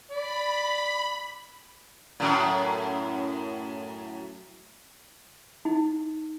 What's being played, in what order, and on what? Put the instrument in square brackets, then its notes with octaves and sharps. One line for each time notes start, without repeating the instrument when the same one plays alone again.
[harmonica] D5 [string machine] B5
[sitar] F#2 A2
[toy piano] D#4